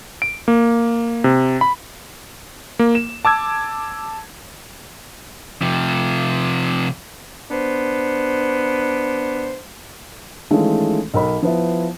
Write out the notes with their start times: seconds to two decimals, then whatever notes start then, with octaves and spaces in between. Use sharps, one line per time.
0.22 D7
0.48 A#3
1.24 C3
1.61 B5
2.79 A#3
2.95 E7
3.25 A5 D6 E6 G#6
5.62 C3 F3
7.51 B3 D4 C5
10.51 D#3 E3 G#3 A3 C#4 F4
11.14 B1 A#4 B5
11.43 F3 B3 E4